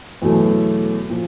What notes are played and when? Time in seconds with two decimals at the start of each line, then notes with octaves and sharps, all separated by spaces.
0.22 E2 B2 F#3 A3
1.10 A#2 F3